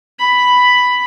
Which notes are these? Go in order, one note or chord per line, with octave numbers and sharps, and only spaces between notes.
B5